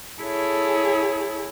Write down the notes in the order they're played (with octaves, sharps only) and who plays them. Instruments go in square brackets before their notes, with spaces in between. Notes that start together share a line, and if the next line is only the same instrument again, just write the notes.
[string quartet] E4 G#4 A4 C#5